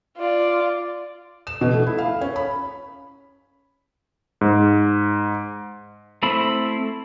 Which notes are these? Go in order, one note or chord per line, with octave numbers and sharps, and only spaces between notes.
F4 D5
E7
B2
A3
E4
F5
C#4
B5
G#2
A3 C4 E4 B5